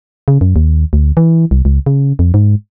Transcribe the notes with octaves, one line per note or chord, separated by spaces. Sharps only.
C#3
F#2
D#2
D2
E3
C2
C#2
C#3
F2
G#2